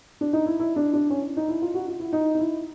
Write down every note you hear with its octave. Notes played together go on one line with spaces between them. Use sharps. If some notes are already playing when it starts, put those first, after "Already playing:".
D4
D#4
E4
E4
D4
D4
C#4
D#4
E4
F4
F#4
F4
E4
D#4
D#4
E4